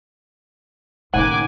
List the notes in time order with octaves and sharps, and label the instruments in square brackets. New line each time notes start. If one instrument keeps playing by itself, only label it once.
[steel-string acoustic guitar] D#2 [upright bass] A2 C#3 [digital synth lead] F#5 [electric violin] G#5 D6